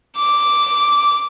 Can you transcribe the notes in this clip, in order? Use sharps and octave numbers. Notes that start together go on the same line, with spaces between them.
D6